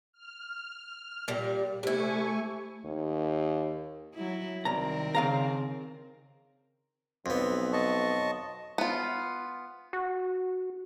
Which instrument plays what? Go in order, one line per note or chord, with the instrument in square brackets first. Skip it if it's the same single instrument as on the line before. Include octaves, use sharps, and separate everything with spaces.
[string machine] F6
[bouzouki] A#2 G3
[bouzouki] C3 E4 [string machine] A3 G#5 C#6
[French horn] D#2
[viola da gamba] F#3 E4
[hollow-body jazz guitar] C2 A#5 [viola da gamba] D#3 C4 A#4
[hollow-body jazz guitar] C#3 F5 A#5
[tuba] B1 [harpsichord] F2 B3
[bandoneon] D#5 A5 C#6
[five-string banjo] B3 F4
[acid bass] F#4